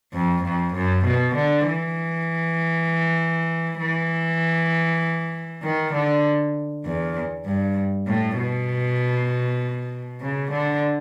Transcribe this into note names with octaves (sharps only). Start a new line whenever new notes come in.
F2
F2
F#2
B2
D3
E3
E3
D#3
D3
E2
G2
A2
B2
C#3
D3